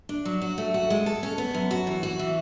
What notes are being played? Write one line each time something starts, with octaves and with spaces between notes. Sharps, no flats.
D4
F#3
F#4
A3
F#4
G#3
A4
C#4
B3
F#2
F#4
E3
F#4
E3